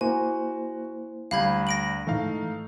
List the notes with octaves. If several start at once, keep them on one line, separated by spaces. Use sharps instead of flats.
A#3 E4 F#4 C5 G#5
D2 G3 F5 B5 G6 G#6
A#6 D7 F#7
G#2 E3 A3 D#4 F5